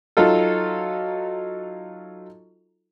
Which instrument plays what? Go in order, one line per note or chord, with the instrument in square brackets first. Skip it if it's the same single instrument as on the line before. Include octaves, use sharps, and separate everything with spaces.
[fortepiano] F#3 D#4 F4 A4